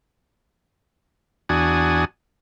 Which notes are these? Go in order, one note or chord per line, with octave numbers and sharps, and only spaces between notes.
E2 D4 F#4 G#5 D#6